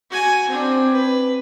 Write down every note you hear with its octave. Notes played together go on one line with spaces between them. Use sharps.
F#4 G#5
C4 D4
B4